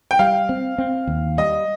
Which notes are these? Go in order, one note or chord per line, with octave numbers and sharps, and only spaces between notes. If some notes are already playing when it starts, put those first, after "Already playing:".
G5
G3 F5
C4
C4
D#2
G3 D#5